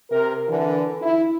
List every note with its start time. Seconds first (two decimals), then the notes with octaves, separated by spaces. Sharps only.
0.11 C3 A#4
0.49 D3 E3
1.02 E4